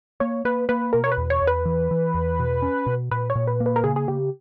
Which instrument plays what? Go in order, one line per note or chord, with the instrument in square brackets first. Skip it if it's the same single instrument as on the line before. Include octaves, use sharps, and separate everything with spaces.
[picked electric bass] A#3 [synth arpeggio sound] C#5
[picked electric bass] A#3 [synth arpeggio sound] B4
[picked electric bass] A#3 [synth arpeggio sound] B4
[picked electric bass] B2 [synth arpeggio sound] A#4
[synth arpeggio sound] C#5
B4
[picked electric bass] E2
[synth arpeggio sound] C#5
[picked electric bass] E2
[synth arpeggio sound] B4
[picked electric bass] E3
E3
E2
B2
C#4
B2
[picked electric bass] A#2 [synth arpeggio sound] B4
[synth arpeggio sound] C#5
[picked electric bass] A#2
[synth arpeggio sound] B4
[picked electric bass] A#3
[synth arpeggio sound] B4
A#4
[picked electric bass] C#3 [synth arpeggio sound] G#4
[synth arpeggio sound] G#4
[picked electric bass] C#3 [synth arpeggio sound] G4